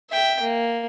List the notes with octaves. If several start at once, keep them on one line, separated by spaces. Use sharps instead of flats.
E5 G5
A#3